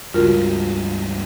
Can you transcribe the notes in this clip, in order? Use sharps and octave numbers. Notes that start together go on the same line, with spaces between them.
C#2 G2 F4 F#4 A#4